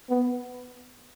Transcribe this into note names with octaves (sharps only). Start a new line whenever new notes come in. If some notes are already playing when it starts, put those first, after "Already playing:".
B3